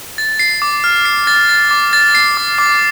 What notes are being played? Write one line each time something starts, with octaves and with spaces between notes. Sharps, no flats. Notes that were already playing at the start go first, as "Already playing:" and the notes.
A6
C7
D6
F6
C7
A6
A6
D6
A6
C7
D6
D6